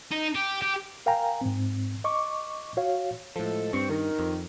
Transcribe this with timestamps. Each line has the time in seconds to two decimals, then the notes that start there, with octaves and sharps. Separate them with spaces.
0.12 D#4
0.35 G4
0.62 G4
1.06 A#4 F5 G5 G#5 A#5
1.41 G#2 C4
2.04 D#5 C#6 D6
2.77 F#4 C#5 F5
3.36 A2 F3 G#3 A4
3.73 G2 C4 C#6
3.90 D#3 A#4
4.19 F2